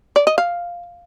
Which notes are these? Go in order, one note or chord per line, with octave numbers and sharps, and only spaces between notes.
D5
D#5
F5